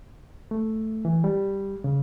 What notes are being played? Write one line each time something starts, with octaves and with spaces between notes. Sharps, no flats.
A3
E3
G3
C#3